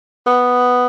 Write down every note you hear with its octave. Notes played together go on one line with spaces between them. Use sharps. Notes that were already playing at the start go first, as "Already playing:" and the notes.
B3